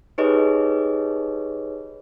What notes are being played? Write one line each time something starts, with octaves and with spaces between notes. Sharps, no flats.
D#4 G4 G#4 B4 C#5 D#5